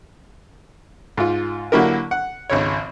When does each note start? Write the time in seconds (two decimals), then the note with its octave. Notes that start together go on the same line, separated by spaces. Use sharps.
1.17 G#2 F4
1.72 D3 F#3 A#3 E4 G4 A#4
2.11 F#5
2.50 G#1 C#2 C#5